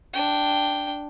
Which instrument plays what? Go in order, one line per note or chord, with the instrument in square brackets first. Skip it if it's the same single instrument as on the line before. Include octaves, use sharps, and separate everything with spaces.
[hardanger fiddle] D4 G5